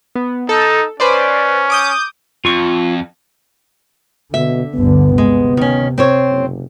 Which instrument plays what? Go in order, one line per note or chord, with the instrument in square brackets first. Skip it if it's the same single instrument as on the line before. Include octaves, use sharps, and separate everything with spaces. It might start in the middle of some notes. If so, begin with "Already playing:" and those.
[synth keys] B3
[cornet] D#4 [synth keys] A4
[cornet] C#4 [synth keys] B4 C5 D5
[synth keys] D6 D#6 G6
[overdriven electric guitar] F2 [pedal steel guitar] F4 C#6
[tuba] B2 [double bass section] D3 [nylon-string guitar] E5
[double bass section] G1 D2 D3 [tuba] B3
[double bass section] C3 [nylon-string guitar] G#3
[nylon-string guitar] D#3 C#4
C4 C5 C#5
[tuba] F#1